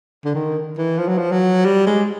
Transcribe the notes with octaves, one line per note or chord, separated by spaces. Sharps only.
D3
D#3
E3
F3
F#3
F3
F#3
G3
G#3